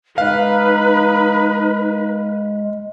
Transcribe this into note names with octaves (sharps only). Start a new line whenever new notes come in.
G#3 D#4 B4 F5